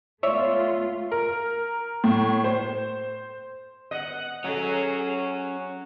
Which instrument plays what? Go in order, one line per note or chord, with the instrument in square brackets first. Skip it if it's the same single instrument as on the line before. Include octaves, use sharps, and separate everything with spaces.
[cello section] A3 B3 F4 [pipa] C#5 D5 E5
[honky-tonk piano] A#4
A2
C5
[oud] B3 [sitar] D#5 [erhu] F#5
[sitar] F#3 [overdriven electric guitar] C#4 [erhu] G#4 [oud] A4 D#5 E5